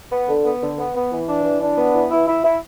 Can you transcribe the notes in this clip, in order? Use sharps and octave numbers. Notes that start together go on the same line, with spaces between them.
B3
D3
B3
D3
B3
B3
E3
D4
E3
D4
B3
E3
E4
E4
E4